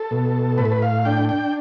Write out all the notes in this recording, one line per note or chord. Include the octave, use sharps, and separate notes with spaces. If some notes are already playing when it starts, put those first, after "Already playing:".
Already playing: A4
B2
A2 B4
A4
B4
F5
D4 G5
G5